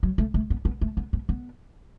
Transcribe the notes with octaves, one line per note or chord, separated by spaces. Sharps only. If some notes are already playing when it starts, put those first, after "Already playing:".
F#3
A3
A3
B3
B3
A3
B3
B3
B3